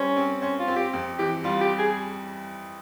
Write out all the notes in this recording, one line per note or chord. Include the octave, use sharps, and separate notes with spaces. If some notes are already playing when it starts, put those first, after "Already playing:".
Already playing: G3 C#4 C5
C4
C#4 C5
F4
C4
G4
F2
E3 G4
G3 F4
G4
G#4